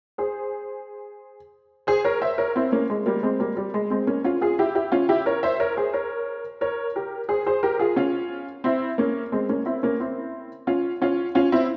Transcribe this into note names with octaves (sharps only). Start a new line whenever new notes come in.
G#4 C5
G#4 C5
A#4 C#5
C5 E5
A#4 C#5
C4 E4
A#3 C#4
G#3
G3 A#3
G#3 C4
G3 A#3
G3
G#3
G#3 C4
A#3 C#4
C#4 F4
F4 G#4
E4 G4
E4 G4
C#4 F4
E4 G4
A#4 C#5
C5 E5
A#4 C#5
G#4 C5
A#4 C#5
A#4 C#5
G4 A#4
G#4 C5
G#4 C5
G4 A#4
F4 G#4
C#4 F4
C4 E4
A#3 C#4
G#3 C4
A#3 C#4
C4 E4
A#3 C#4
C4 E4
C#4 F4
C#4 F4
C#4 F4
C4 E4